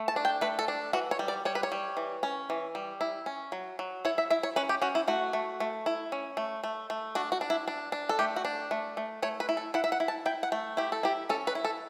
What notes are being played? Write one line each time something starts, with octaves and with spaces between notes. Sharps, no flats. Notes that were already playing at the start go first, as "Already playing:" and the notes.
Already playing: A3
A5
D4
G5
A3 B4
A4
D4
E3 F#4
C#5
G3
D5
G3 C#5
B4
C#5
G3
E3
C#4
E3
G3
E4
C#4
F#3
F#3
E4 C#5
E5
E4 E5
C#5
C#4 B4
G4
C#4 F#4
E4
A3 F#4
A3
A3
E4
C#4
A3
A3
A3
D4 F#4
F#4
D4
E4
D4
D4
A4
A3 G4
F#4
D4
A3
A3
A3 C#5
B4
E4
A4
E4 F#5
E5
F#5
E4
A5
E4 G5
F#5
A3
E4 G4
A4
E4 G4
C#4 A4
B4
E4
A4